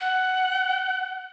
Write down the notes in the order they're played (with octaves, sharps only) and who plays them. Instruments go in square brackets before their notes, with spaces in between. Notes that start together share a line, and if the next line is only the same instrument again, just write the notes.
[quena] F#5